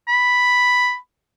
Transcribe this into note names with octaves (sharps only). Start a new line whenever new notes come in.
B5